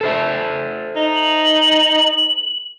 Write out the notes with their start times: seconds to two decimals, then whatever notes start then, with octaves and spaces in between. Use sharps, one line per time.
0.01 A4 C5 E5
0.96 D#4
1.16 F#7